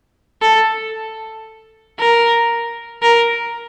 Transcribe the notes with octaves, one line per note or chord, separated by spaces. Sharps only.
A4
A#4
A#4